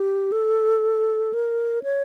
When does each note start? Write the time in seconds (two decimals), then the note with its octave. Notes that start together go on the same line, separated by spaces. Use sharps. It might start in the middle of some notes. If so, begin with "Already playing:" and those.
Already playing: G4
0.32 A4
1.33 A#4
1.83 C#5